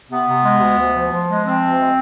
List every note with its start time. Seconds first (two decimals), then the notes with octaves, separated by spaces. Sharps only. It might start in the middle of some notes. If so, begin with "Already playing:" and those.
0.10 C3 B3
0.27 C3
0.44 G#3
0.61 D2
0.78 D2
0.95 F3
1.11 F3
1.29 G#3
1.44 F3 C4
1.61 D2
1.79 G#3